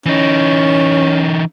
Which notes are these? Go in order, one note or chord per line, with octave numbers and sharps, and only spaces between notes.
E3 C#4 D#4